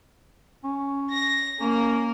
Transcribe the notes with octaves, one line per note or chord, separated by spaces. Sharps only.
C#4
A#6
A#3 C#4 A#4